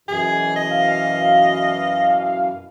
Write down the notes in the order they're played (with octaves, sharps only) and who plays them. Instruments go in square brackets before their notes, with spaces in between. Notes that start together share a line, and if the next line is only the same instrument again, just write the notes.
[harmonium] F#2 B2 E3 [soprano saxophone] G#4
[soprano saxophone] D#5
[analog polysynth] F5